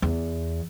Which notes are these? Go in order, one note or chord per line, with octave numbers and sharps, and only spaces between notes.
E2